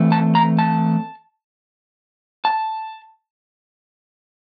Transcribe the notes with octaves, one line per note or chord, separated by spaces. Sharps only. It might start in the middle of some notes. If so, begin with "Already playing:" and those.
Already playing: E3 A3 C4
A5
A#5
A5
A5